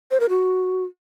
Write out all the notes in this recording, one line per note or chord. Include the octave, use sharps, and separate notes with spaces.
C5
A#4
F#4